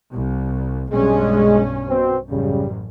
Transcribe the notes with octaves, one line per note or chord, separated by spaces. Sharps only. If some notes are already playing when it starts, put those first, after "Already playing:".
C2
B1 G2 G#3 C#4
B2 C4
A1 F#2 C#3 G3